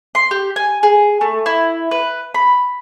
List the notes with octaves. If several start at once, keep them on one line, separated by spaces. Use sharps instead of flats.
C6
G4
G#5
G#4
A3
E4
B4
B5